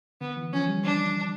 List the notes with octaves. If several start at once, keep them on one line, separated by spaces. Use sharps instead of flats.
D3 B3
E3
F3 C#4
G3
D4